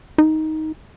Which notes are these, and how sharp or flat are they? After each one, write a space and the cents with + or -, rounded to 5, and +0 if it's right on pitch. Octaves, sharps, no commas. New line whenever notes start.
D#4 +10